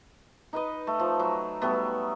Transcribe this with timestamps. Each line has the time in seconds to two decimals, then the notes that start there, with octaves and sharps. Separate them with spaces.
0.53 D#4 B4 D#5
0.87 A3
0.99 F3
1.19 F#3
1.62 F#3 G3 A3 B3